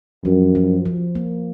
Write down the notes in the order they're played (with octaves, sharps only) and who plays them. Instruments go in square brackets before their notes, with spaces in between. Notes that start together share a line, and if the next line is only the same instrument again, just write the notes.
[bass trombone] F#2 [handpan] F3
[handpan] F3
F3
A#3